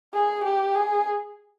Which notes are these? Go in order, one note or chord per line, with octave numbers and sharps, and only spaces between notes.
G#4
G4
G#4